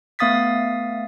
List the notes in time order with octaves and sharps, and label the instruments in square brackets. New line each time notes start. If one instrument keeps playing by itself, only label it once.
[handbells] A3 B3 F5 D#6 A6 B6